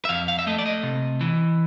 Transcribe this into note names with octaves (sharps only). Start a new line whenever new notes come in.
E5
F2 F5
F5
E5
A3 D#5
D5
D#5
C3
E3